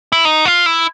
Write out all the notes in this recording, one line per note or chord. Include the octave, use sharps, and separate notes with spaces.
E4
D#4
F4
E4